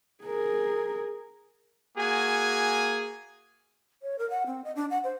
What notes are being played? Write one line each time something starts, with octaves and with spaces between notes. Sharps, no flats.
G#4 A#4
A#3 F#4 G#4 G#5
C#5
A#4
F#5
C4
D#5
D4
F#5
C5